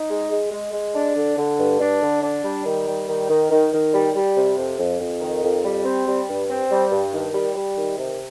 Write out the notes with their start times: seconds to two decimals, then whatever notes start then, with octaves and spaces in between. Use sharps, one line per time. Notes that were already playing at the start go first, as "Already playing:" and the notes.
Already playing: D#4
0.09 G#3
0.30 G#3
0.51 G#3
0.72 G#3
0.94 D4
1.15 D3
1.37 D3
1.58 G2
1.79 D4
2.01 D3
2.22 D4
2.43 G3
2.64 D#3
2.86 G3
3.08 D#3
3.29 D#3
3.50 D#3
3.71 D#3
3.93 G3
4.14 G3
4.35 C3
4.57 F2
4.78 F2
4.99 F2
5.21 D#3
5.42 F2
5.63 G3
5.84 C4
6.06 G3
6.27 G2
6.48 C4
6.70 G3
6.91 G2
7.13 D#3
7.34 G3
7.55 G3
7.76 D#3
7.98 C3